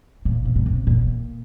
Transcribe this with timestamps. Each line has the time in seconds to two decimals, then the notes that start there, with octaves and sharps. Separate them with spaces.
0.25 A#2
0.45 C3
0.56 A#2
0.66 C3
0.87 A#2